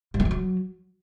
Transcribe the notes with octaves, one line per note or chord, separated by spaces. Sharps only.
G2
G#3
F3
F#3